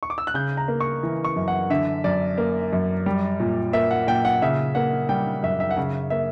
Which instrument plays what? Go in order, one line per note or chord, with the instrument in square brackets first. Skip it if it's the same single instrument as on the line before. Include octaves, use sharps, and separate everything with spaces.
[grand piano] C#6
D6
E6
F#6
C#3 G6
A#5
A#3
C#6
E3
C#6
F#2
F#5
D3 E5
F#2 D5
A#3
F#2
G3
A#2
A#3 E5
F#5
A#2 G5
F#5
C#3 E5
A#3 F#5
G3 G5
F#2 E5
E5
F#5
C#3 E5
A#3 E5